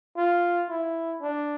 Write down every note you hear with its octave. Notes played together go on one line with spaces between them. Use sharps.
F4
E4
D4